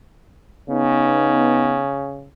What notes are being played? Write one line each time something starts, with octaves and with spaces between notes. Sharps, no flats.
C#3 B3 D#4